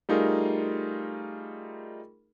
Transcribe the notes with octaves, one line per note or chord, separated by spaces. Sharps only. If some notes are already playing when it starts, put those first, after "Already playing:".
G3 A3 D#4 F4 G#4 A#4